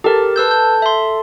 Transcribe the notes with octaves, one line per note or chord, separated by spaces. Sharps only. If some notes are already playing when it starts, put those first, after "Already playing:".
G4 A4 A#4 A5
B4 E6 G6
G6
E5 C6